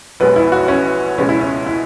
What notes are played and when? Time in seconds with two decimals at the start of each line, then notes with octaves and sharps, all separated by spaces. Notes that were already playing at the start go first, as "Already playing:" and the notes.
0.20 B1 B2 G#3 B4
0.36 E4
0.52 F#4
0.68 C#4
1.18 C#2 B2 G#3 C#4
1.29 E4
1.40 C#4
1.67 E4